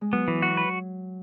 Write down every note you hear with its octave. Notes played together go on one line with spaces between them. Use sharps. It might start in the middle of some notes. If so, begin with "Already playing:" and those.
G#3
F#3 B3
E3
F#4
B4